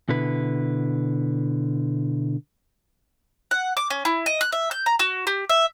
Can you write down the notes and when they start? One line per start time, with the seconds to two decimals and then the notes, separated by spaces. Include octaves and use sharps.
0.09 B2 D3 E4 B4
3.51 F#5
3.77 D6
3.90 C#4
4.05 E4
4.26 D#5
4.41 F#6
4.52 E5
4.71 G6
4.86 A#5
4.99 F#4
5.27 G4
5.49 E5